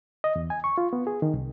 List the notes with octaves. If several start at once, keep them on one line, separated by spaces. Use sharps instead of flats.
D#5
E2
G#5
C#6
F4
B3
G#4
D#3
C2